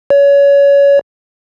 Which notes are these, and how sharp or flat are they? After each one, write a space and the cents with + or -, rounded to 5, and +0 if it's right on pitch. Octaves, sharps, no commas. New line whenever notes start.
C#5 +25